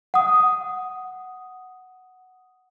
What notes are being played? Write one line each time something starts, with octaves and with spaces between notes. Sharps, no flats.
F#5 D#6